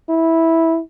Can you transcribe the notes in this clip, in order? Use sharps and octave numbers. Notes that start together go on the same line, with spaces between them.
E4